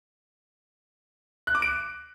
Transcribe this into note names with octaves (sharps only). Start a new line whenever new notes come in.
F#6
D6
D7